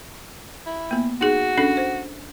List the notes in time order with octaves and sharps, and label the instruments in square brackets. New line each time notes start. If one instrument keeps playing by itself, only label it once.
[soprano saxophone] E4
[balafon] A#3 B3
[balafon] D#4 G#4 [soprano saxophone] F#4
[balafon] C#4 D4 A4
C5